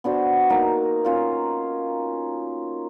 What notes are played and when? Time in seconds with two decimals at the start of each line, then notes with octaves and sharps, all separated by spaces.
0.04 B3 D4 F#4 C5
0.50 A#3 D#4 A#4
1.05 C#4 F4 F5